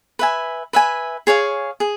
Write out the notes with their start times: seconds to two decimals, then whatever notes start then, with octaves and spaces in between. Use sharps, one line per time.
0.19 B4 E5 G#5
0.73 B4 E5 G#5
1.27 G#4 C#5 F5
1.80 G#4